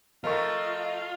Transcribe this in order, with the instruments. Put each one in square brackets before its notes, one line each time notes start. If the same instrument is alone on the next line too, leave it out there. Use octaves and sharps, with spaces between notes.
[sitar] F3 A3 [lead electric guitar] F4 [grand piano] A#4 C#6 [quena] D#5